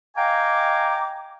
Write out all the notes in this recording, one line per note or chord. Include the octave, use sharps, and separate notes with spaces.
D#5 F5 G5 G#5 A#5 D6